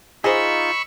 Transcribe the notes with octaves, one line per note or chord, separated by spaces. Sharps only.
D#4 F4 G#4 C5 D#5 B5 C#6 E6